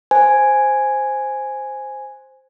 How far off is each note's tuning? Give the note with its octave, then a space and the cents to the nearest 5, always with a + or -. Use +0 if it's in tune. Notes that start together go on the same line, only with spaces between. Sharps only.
C5 +0 G#5 +0